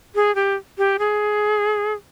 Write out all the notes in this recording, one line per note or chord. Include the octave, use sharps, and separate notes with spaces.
G#4
G4
G4
G#4